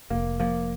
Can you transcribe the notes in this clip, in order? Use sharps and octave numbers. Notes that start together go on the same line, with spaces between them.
F1 A#3
F3 A#3